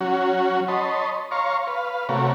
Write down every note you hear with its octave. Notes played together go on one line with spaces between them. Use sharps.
F#3 C#4 F#4
C#5 D#5 A5 B5 C6
C#5 F5 A#5 C6 C#6
B4 F5
C3 A3 F#4 A#4 C#5